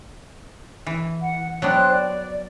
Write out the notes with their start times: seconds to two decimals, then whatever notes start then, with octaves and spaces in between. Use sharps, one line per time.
0.86 E3
1.21 F#5
1.62 F#3 B3 D4 C5 G5 F#6
1.92 D5